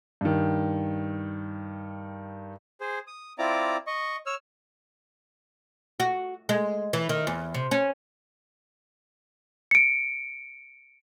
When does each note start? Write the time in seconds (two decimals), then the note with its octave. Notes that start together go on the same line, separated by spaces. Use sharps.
0.21 G2 D#3
2.81 G#4 C5
3.07 D#6
3.39 C4 E4 F4 D5 A#5 D6
3.87 D#5 C#6
4.26 C#5 E6 F6
6.00 F#4
6.49 G#3
6.93 E3
7.09 D#3
7.27 E2
7.54 C3
7.71 C#4
9.71 C#7 D7